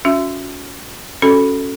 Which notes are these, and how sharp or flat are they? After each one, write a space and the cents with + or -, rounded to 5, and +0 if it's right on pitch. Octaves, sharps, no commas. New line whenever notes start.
C#4 +30 F#4 -35 E5 +20
C#4 +0 F#4 +0 A4 +0